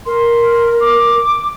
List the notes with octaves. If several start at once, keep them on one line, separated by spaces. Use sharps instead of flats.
A#4 C6
D6